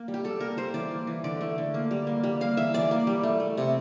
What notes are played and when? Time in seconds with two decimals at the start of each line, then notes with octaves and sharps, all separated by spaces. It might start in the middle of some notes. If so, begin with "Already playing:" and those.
Already playing: A#3
0.08 G3
0.14 G4
0.24 G3 A4
0.40 A#3 A#4
0.57 G3 C5
0.74 E3 D5
0.91 A#3
1.07 E3
1.24 D3 D5
1.41 A3
1.58 D3
1.74 A#3
1.91 G3
2.07 A#3
2.24 G3
2.41 A#3 F5
2.57 E3 E5
2.74 E3 D5
2.91 A#3
3.07 G3
3.23 A3
3.40 A3
3.57 C3